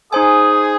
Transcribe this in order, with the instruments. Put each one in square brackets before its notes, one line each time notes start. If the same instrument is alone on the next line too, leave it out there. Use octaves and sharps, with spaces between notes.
[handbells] D#4 C5 G#5 [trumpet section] G#4